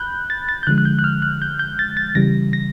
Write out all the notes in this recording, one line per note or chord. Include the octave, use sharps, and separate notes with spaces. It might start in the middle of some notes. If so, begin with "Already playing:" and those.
Already playing: B5 F#6 G6
A6
A6
G6
D3 F3 G#3 F#6
F#6
G6
F#6
F6
F#6
G6
G6
A6
A6
C#3 E3 G3 A#6
A#6